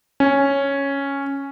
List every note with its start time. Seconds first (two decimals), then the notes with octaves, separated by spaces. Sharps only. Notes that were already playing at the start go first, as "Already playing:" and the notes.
0.20 C#4